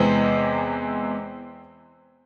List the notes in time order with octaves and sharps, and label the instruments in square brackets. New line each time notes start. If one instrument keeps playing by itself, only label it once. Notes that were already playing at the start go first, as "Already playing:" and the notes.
Already playing: [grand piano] E2 C3 E3 G#3 B3 C4 C5